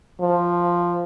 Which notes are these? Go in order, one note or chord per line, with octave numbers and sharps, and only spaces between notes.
F3